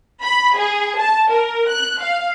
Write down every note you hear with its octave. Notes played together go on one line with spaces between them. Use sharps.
B5
G#4
A5
A#4
F#6
F5